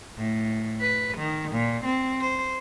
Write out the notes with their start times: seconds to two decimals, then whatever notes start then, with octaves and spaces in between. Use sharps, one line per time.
0.18 A2
0.81 B4
1.18 D#3
1.52 A#2
1.85 C4
2.21 C5